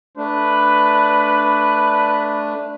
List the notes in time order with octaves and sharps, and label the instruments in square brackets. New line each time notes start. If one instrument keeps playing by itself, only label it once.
[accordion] A3 D4 [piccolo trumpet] B4